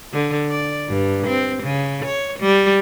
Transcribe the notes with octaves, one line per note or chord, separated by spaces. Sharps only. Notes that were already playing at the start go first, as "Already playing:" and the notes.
D3
D5
G2
C4
C#3
C#5
G3